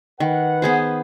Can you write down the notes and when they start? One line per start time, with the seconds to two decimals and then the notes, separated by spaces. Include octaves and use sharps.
0.20 D#3 B4 F#5
0.62 B3 G#4 C5